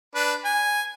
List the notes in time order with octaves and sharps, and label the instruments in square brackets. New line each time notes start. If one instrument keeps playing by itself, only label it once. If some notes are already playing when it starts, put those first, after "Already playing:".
[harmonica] D4 B4
G#5